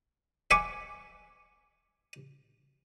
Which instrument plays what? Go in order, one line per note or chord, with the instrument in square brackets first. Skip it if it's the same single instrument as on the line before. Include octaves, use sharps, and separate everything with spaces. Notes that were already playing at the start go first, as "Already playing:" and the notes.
[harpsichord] E5 F#5 G#5 C#6 D6